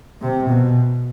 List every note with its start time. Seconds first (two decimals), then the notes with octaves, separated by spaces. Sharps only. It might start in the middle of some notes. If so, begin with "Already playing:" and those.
0.21 C3
0.49 B2